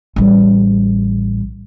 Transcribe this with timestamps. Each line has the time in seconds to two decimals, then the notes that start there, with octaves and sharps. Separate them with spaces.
0.16 A1 G3